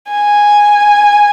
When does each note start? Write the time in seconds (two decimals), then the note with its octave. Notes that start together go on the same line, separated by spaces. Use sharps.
0.12 G#5